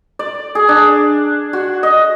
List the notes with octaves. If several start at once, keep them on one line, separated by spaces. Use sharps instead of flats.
D5
G#4
D4
F#4
D#5